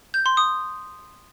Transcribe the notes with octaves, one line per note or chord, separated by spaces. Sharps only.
G6
C6
D#6